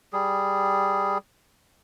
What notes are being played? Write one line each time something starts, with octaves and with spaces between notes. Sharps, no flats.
G3 G#4